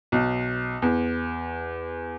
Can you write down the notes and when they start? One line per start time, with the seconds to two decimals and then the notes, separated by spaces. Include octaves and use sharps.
0.12 B1
0.82 E2